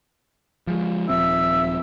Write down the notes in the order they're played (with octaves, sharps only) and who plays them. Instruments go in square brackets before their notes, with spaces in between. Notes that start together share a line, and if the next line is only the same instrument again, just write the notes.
[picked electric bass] F3 G#3
[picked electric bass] D#1 F3 C4 [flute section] E5 E6